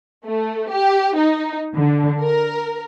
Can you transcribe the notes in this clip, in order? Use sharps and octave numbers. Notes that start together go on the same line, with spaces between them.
A3
G4
D#4
D3
A#4